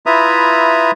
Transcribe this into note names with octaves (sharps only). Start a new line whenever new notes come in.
E4 F4 B4 E5 A#5 D#6